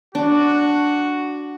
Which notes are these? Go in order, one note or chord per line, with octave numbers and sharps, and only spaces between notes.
D4 F#4